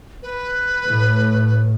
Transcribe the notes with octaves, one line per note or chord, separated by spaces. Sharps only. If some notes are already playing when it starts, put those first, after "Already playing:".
B4
A2